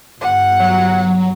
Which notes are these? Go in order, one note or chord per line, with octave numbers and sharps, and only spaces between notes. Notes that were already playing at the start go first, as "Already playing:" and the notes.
G1 F#5
F#3